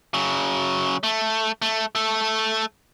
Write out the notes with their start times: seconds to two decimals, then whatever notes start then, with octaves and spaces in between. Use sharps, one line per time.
0.14 C#3 F#3
1.03 A3
1.62 A3
1.95 A3 A4